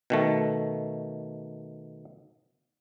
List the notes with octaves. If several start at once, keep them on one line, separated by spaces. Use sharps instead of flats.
B2 D#3 A3